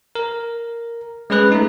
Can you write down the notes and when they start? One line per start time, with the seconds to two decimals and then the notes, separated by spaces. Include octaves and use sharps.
0.15 A#4
1.30 G#3 C#4 G#4 B4 F#6
1.52 A3 D#4